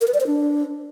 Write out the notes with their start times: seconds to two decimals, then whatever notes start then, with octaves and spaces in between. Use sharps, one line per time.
0.01 A#4
0.07 B4
0.14 D5
0.20 C5
0.27 D4